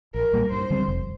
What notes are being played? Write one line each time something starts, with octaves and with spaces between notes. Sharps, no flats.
A#1 A#4
A#2 G3 A#3
G2 C5
D3 G3 C4
F1